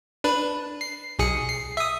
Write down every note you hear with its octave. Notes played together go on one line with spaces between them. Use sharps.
D4 B4
C7
B1 G#4 C#7
C7
E5 D#6